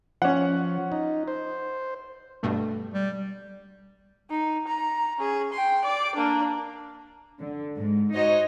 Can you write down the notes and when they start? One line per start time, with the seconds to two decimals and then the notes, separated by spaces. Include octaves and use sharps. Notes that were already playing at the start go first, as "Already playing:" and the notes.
0.22 F3 C#4 F#5
0.92 D#4
1.28 C5
2.43 G2 B2 A3
2.94 G3
4.30 D#4
4.68 A#5
5.19 C#4 G#4
5.53 G5 C6
5.84 D5 D6
6.15 A#3 D4
7.40 D3
7.77 G#2
8.13 D#4 F#4 C5 C#5 D#5